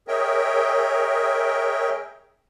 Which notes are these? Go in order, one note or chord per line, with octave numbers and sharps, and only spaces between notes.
G#4 A#4 C#5 D#5 E5 G5